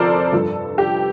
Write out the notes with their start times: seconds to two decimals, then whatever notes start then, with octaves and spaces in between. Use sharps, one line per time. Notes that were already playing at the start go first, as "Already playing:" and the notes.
Already playing: F2 C3 F3 A4 A#4 C5 D5
0.32 G2 F3
0.78 G4